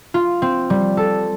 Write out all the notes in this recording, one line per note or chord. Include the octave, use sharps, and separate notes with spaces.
F4
C4
G3
A4